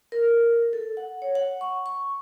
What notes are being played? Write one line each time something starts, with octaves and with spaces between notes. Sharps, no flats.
A#4
A4
F#5
C#5
F#5
C#6
C#6